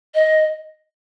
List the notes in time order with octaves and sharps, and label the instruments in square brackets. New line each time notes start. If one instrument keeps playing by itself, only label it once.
[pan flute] D#5